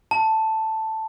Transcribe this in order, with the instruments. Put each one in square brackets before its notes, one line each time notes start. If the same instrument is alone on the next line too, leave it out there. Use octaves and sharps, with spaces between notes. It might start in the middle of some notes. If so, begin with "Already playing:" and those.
[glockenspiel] A5